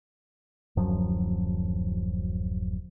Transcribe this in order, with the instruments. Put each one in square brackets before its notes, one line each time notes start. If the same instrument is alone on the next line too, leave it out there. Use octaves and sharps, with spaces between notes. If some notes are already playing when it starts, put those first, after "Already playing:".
[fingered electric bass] D1 F#2 F3 F#3